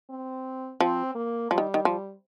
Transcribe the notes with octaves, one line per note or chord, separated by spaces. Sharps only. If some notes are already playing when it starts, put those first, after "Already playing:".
C4
F3 C4
A#3
F3 G3
D#3
D#3
F3